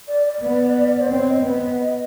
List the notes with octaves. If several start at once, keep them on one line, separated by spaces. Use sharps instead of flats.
D5
D5
B3
C5
C4 C#5
D#5
B3